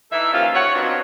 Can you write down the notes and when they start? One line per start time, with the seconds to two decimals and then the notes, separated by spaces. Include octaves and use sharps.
0.12 E3 D#4 A4 E5
0.34 D#2 F3 C#4 F4 F5
0.55 C#5 F#5
0.75 F#3 B3 C4 D4 D#4 F4